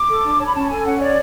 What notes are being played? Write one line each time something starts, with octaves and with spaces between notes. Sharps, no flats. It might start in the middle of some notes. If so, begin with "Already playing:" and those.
Already playing: D6
A4
D4
C#5 A5
B5
C#4 A5
A4 G#5
C#4 F#5
C#5 D5